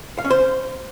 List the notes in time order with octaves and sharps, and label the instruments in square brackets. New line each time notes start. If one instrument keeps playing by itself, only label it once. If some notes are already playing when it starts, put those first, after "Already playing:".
[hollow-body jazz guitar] F5
C#4
C5